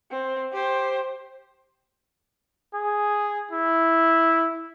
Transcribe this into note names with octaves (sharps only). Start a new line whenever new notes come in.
C4
G4 C5
G#4
E4